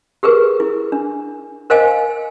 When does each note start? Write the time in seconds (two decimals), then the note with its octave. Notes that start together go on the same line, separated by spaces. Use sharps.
0.23 G4 G#4 A#4 B4
0.60 E4
0.92 D4
1.70 A#4 C5 D#5 F5 G5 G#5